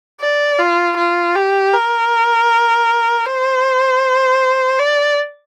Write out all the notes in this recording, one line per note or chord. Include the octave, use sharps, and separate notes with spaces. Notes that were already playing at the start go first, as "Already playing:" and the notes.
D5
F4
F4
G4
A#4
C5
D5